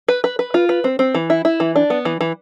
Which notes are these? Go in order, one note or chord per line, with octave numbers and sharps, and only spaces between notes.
B4
B4
B4
F4
B4
C4
C4
E3
E4
E4
E3
D4
B3
E3
E3